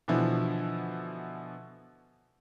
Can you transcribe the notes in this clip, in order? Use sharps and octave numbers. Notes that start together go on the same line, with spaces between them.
B2 D3 E3 F3 E4 F#4